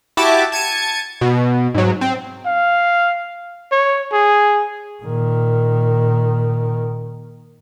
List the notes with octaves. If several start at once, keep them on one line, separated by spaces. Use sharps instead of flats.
E4 F#4 G4 E5 A5 D6
A5 G#6 C#7 D#7
B2
G#2 F#3
C4
F5
C#5
G#4
A#2 D#3